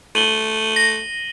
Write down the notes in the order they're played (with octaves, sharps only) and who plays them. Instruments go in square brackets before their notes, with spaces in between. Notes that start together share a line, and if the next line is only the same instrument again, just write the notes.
[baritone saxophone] A3 [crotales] D#7 F#7 G7
[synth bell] A#6